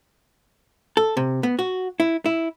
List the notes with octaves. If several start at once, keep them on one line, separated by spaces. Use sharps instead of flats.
A4
C3
B3
F#4
E4
E4